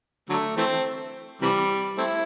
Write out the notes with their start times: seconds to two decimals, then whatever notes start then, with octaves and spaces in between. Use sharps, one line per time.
0.29 D3 F#3 A3
0.57 E3 A3 C4
1.42 C3 E3 G3
1.98 A3 C4 E4